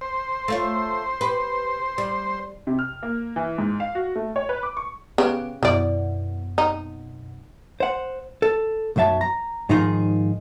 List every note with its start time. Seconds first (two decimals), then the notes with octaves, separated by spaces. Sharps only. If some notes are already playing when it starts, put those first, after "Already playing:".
0.01 C5
0.48 A3 F4 C#5
1.21 G4 B4
1.98 G3
2.67 C3
2.79 F6
3.03 A#3
3.36 E3
3.58 G#2
3.80 F5
3.95 F#4
4.16 A3
4.36 C#5
4.49 B4
4.63 D6
4.77 C#6
5.18 C#3 B3 G4
5.63 F#2 B2 E3 D5
6.58 D#4
7.80 C5 F#5
8.42 A4
8.96 B1 F#2 F#3 E5 A5
9.21 A#5
9.69 G#2 D#3 F3 D#4 F4 G#4